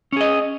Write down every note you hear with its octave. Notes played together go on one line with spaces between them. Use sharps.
C#4 G#4 D#5